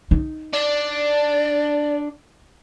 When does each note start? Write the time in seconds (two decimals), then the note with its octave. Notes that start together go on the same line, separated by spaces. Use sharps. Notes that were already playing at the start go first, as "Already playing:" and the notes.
0.11 D#4
0.54 D4 D5